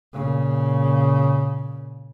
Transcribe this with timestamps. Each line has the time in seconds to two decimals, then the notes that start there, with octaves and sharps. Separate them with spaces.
0.13 A#2 C#3